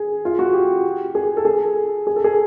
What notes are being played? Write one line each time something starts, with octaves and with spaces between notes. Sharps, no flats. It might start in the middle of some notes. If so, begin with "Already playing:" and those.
Already playing: G#4
F4
F#4
G4
G#4
A4
G#4
G#4
A4
G#4